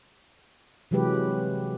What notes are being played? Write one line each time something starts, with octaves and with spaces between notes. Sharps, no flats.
C3 E3 F#3 G#3 G4 B4